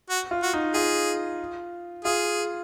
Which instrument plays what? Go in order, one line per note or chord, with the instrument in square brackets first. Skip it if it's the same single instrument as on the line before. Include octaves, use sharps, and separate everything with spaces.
[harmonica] F#4
[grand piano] F4
[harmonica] F#4
[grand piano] D#4
[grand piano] F4 [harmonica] G#4
[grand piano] F4 [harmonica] G#4